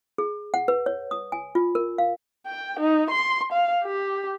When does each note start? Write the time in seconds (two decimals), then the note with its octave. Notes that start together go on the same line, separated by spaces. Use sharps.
0.18 G#4
0.54 F#5
0.68 B4
0.86 C#5
1.11 D#6
1.32 G#5
1.55 F4
1.75 A#4
1.98 F5
2.47 G5
2.80 D#4
3.11 C6
3.52 F5
3.85 G4